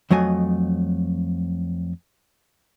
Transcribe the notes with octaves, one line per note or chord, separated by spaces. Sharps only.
F2 F#3 A3 D#5 G#5